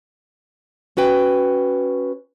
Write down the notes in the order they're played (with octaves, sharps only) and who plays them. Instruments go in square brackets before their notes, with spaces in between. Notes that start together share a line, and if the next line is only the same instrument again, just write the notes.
[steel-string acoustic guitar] C#4 F#4 B4 G5